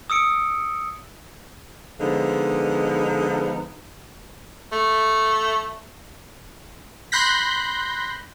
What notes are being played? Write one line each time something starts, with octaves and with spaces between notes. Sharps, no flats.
D#6 E6 C#7 D7
D3 F3 G#3 B3 D#4
A3
B5 C6 F#6 G6 A#6 B6